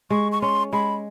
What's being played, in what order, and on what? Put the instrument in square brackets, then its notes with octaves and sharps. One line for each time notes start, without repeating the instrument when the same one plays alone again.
[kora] G#3 [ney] C#6
[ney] C#6
[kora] C#4 [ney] C6
[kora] G#3 [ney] B5